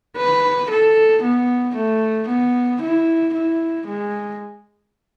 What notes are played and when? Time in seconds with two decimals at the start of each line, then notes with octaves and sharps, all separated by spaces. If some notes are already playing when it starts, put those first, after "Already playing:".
0.17 B4
0.70 A4
1.23 B3
1.76 A3
2.28 B3
2.81 E4
3.34 E4
3.87 G#3